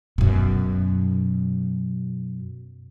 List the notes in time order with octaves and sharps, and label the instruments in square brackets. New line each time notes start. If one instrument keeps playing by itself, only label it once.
[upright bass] F#2 B2